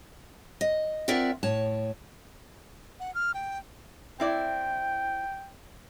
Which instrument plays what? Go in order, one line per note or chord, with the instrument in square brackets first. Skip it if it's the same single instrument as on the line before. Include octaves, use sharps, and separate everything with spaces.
[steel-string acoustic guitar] D#5
C4 F4 A#4 D5 E5 F#5
A2 C#5 A5
[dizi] F#5
F6
G5
[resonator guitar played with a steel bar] C4 E4 D5 [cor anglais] G5